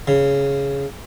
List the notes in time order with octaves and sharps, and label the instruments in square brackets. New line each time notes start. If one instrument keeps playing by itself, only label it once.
[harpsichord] C#3